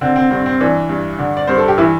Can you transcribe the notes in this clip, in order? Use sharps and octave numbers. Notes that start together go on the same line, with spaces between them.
D3 C4
C4
G2 C4
C4
E3 D4
G2
D3
D5
G2 C5
A4
G4
E3 E4